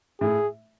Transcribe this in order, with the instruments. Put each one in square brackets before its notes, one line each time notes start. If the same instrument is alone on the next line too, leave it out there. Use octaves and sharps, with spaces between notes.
[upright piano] A2 [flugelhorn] G#4